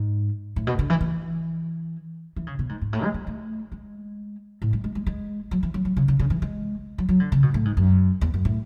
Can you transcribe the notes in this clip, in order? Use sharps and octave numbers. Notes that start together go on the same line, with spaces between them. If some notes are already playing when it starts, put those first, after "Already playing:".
Already playing: G#2
A2
B2
D3
E3
E3
E3
C#3
B2
G#2
G#2
A2
G#3
G#3
A3
G#3
A2
G#3
G#3
G#3
G#3
F#3
E3
F#3
F#3
C#3
C#3
C#3
E3
G#3
F#3
F#3
D3
C#3
B2
A2
G#2
F#2
E2
F#2
A2